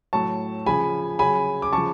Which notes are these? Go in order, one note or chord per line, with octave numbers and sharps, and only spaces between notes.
A2 F#3 A5 C#6
C#3 F3 G#5 B5
C#3 F#3 G#5 B5
D6
C#3 F3 A5 C#6